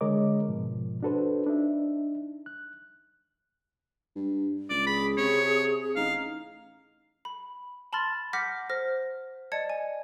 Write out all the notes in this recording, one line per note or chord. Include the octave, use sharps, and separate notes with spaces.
D3 G#3 A#4 C#5 D#5 D6
G#2 B2 F3
D4 F#4 A4 B4 C5
D4 D#4 E5
F#6
G2
C#2 D5
G#4 B5
C3 C#5
A1 D#4 F5
B5
A5 B5 C6 F6 A6
F#5 D6 F6 G6 A#6 B6
C5 F6 A#6
D5 D#5 A5 G#6 C#7
G#5